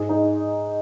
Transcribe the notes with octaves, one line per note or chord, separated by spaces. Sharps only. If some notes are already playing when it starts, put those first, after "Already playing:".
Already playing: G#2 G#4
G#3 D#4